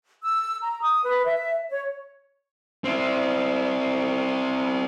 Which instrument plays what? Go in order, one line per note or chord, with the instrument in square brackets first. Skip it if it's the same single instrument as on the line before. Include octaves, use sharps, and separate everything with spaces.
[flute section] E6
A#5
D#6
B4
E5
C#5
[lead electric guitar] C4 E4